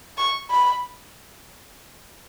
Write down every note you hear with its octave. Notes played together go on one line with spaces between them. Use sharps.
C#6
B5